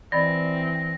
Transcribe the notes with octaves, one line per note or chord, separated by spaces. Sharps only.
E3 C4 D5 D#5 B5 A#6